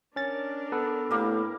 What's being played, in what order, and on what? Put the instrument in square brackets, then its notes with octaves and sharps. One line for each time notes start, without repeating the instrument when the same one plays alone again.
[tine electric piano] C#4 A6 [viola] D4 A#4
[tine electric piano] B3 A4 B4
[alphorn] A2 [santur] G3 A#3